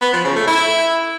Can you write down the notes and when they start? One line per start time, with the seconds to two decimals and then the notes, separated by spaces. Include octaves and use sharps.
0.02 B3
0.13 F3
0.24 C#3
0.36 A3
0.47 E4